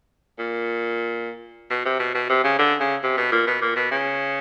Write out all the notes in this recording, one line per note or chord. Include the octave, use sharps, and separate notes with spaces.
A#2
B2
C3
B2
B2
C3
C#3
D3
C#3
C3
B2
A#2
B2
A#2
B2
C#3